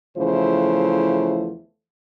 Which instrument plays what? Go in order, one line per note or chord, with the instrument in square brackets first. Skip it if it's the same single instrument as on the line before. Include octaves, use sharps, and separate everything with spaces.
[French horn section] E2 C#3 F3 A3 E4 C5